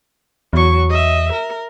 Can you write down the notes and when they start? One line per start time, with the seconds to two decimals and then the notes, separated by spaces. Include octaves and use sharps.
0.53 E2 F#3 C#6
0.90 D#5 E5
1.32 A#4